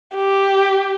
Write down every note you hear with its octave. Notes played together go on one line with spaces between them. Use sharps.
G4